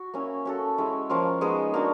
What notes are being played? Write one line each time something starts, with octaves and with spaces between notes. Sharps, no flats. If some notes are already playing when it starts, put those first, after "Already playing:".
Already playing: F#4
A#3 C#4 E4
C#4 F#4 A4
G#3 C#4 E4
F3 A#3 C#4 F4
G#3 B3 D#4 G#4
A#3 D4 F#4